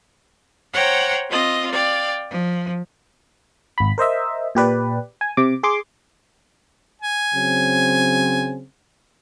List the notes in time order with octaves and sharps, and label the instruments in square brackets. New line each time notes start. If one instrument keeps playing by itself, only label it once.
[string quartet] C5 C#5 F#5 G5 A#5
C4 F4 D#5
D5 F5 G5
F3
[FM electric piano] G#1 B5
A#4 C5 D#5 E5
A#2 G4 B4 D5
G#5
C3 D6
G#4 C6 D6
[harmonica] G#5
[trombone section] C#3 F#3 C4